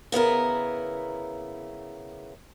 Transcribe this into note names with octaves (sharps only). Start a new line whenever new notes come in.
C#3 B3 E4 A#4